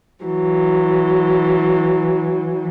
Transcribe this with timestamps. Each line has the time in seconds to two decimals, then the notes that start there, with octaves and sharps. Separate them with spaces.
0.25 E3 F#3